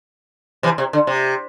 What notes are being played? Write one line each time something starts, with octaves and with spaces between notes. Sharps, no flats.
C3 E3
C3
D3
C3